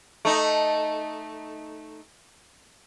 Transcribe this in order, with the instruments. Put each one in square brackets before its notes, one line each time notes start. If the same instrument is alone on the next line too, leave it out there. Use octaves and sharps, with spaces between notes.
[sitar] A3 D#4